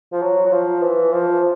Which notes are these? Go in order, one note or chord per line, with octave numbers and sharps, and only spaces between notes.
F3
F#3
F#3
F3
E3
F3